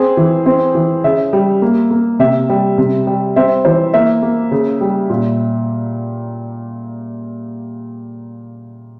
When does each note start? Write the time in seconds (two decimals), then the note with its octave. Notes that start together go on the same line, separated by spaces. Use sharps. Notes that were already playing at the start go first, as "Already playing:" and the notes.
Already playing: C4 G#4
0.17 E3
0.46 C4
0.75 E3
1.04 C#3 E5
1.33 G3
1.62 A#3
1.91 A#3
2.19 C3 E5
2.49 G3
2.78 C3
3.07 G3
3.36 C4 E5
3.65 E3 C5
3.94 A#3 E5
4.23 A#3
4.51 C#3
4.81 G3
5.10 A#2